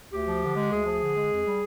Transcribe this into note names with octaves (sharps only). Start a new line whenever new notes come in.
D2 G4
F3
D3
G#3
D2 G#4
F3
D3
G#3
F2
G3